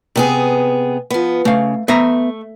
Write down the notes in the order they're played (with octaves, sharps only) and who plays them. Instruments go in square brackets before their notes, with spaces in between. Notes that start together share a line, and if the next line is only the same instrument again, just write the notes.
[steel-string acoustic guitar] C3 B3 G#4
F3 B3
[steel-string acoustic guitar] C#3 [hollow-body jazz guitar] A3 F5
[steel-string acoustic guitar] A3 [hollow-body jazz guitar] B3 E5 A#5